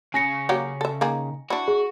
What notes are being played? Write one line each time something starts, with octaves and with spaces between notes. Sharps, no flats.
C#3 G#5 A#6 C#7
F#3 A#3 G4
A4 E5
D#3 A#3 G#4
D4 E4 F#4
G#4